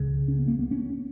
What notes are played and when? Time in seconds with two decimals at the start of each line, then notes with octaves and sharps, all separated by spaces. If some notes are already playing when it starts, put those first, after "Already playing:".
Already playing: C#2 C#3
0.28 C#4
0.39 B3
0.48 A#3
0.59 B3
0.71 C#4